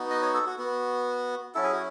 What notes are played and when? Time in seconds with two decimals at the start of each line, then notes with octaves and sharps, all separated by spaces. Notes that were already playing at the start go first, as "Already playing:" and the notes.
Already playing: B3 D#4 F#4
0.10 D#5
0.22 C#5
0.34 A4
0.46 F#4
0.58 B3 F#4
1.55 F#3 C#4 E4 A4
1.63 G#4
1.73 F#4